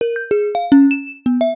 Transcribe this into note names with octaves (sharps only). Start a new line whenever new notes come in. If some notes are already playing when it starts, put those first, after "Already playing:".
A#4
G6
G#4
F5
C#4
E7
B3
E5